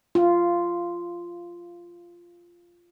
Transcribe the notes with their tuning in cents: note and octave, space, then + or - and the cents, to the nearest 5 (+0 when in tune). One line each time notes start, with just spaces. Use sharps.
F4 -10